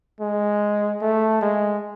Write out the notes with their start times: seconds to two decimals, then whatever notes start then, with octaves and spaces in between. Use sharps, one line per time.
0.21 G#3
1.02 A3
1.41 G#3